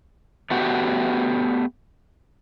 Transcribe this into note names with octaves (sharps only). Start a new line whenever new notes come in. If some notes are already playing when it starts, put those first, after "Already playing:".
A3 B3 F#4 G4